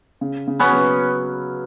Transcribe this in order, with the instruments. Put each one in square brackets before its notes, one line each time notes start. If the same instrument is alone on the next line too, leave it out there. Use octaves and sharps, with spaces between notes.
[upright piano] C#3
C#3
[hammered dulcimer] B3 C#4
[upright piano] F#3